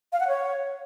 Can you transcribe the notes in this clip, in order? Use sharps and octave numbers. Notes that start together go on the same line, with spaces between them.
F5
F#5
C#5